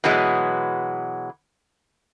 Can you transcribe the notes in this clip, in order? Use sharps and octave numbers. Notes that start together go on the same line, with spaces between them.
B2 E3 F#3 G#3